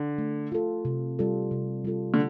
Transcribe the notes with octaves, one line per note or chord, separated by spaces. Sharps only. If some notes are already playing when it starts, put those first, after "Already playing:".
Already playing: D3
A3
F4 A4
C3
G3 F4 A4
C3
G3 F4 A4
D3